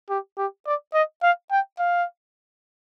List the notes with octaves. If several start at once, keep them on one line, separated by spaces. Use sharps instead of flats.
G4
G4
D5
D#5
F5
G5
F5